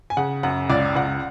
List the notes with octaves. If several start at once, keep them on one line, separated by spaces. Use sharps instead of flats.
G#5
C#3 F#5
F#2 F#5
C#2 D5
C#2 F#5